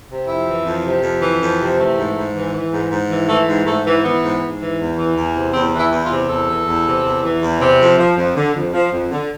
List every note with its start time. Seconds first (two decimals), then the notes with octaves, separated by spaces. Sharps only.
0.09 C3
0.27 F2 E4
0.46 E3
0.65 F2
0.84 C3
1.03 F2
1.22 E3
1.41 F2
1.59 C3
1.78 E3 A3
1.97 G#2
2.16 G#2
2.35 E3
2.53 E3
2.72 G#2
2.90 G#2
3.10 E3
3.28 E3 A3
3.47 G#2
3.66 G#2 A3
3.85 E3
4.04 E3 B3
4.22 G#2
4.41 G#2
4.59 E3
4.79 E2
4.97 E3
5.16 E2
5.35 C3
5.53 E2 C4
5.72 E3
5.79 E4
5.91 E2
6.04 F4
6.10 C3
6.29 E2 A4
6.48 E3
6.66 E2
6.86 C3
7.04 E2
7.23 E3
7.41 E2
7.60 C3
7.80 F2
7.98 F3
8.16 F2
8.35 D3
8.54 F2
8.73 F3
8.92 F2
9.11 D3